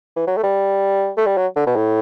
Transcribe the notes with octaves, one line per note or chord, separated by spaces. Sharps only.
E3
F#3
A3
G3
A3
G3
F#3
D3
B2
A2